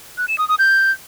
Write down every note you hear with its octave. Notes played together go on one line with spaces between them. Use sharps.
F#6
E7
D#6
D#6
G6